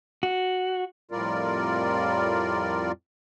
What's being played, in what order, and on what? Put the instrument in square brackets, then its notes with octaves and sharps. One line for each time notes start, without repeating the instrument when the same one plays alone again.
[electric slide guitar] F#4
[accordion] F2 A2 G3 F4 A#4 D5